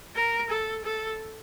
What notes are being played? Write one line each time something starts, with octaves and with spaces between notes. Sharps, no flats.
A#4
A4
A4